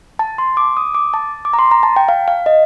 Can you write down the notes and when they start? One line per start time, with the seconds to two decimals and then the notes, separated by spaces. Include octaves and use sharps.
0.19 A5
0.38 C6
0.57 D6
0.77 D#6
0.95 D6
1.14 A5
1.45 D6
1.53 A#5
1.59 C6
1.71 A#5
1.83 A5
1.96 G5
2.09 F5
2.28 F5
2.46 D#5